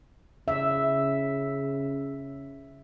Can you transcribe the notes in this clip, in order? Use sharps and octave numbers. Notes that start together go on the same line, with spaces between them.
C#3 E5